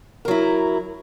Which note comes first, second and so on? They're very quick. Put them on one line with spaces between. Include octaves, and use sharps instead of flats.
A#4 F#3 E4